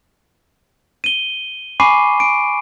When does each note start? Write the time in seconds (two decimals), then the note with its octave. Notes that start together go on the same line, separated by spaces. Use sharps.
1.04 D#7 G7
1.80 G#5 B5 C#6 D6 C7 D#7
2.20 D7